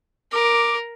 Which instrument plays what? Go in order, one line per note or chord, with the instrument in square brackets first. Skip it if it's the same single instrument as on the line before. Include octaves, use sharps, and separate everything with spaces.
[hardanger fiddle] A#4 [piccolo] D6